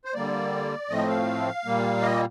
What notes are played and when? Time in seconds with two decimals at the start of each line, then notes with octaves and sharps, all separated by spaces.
0.05 C5
0.14 D3 G3 A#3 D5
0.89 A2 F3 A3 C4 D#5
1.08 F5
1.65 A#2 G3 A#3
2.02 D#5